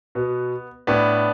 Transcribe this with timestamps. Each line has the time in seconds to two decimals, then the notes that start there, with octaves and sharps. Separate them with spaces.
0.15 B2 B3
0.87 A2 B3 D4